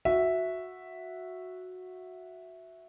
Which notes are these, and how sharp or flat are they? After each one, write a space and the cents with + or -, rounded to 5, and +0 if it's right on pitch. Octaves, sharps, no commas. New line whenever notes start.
F#4 -10 E5 +0